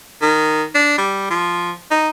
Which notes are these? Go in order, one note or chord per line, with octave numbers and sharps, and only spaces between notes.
D#3
D4
G3
F3
D#4